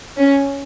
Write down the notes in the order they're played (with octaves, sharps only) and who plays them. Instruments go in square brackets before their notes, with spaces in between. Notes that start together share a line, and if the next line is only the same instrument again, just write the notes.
[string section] C#4